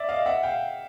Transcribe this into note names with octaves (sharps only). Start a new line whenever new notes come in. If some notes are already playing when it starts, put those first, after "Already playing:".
Already playing: D5 E5
D#5 F5
E5 F#5
F5 G5